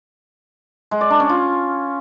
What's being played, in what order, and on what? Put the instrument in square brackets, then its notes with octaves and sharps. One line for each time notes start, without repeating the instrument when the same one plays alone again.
[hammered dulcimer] G#3
D5
D4
C#4
F4